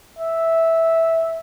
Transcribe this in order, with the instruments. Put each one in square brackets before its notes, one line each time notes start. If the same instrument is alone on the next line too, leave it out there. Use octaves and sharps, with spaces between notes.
[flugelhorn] E5